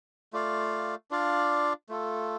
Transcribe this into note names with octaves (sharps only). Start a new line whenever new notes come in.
A3 F4 D5 F5
D4 F4 D5 F5
A3 F4 A4